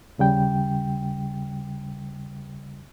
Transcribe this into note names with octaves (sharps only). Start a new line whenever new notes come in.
D#2 C#3 G3 G5